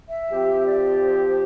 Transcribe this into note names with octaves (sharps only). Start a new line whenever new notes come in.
E5
F3 C4 G4
D5
C5